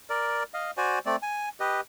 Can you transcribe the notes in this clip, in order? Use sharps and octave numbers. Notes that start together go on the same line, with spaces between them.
A#4 D5
D#5 F5
F#4 C5 D5 G#5
A3 C4 D5
G#5
G4 B4 D#5